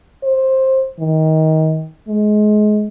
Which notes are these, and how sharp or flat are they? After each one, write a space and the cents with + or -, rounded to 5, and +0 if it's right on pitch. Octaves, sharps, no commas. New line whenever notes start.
C5 +15
D#3 +20
G#3 +25